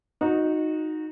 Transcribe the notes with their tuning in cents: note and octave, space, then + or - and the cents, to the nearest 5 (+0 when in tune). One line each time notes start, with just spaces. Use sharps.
D#4 +0 F#4 -20